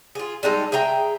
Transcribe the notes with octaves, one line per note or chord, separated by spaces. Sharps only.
F4 G#4
G3 G#3 D#4 A4
G#4 E5 G5 A#5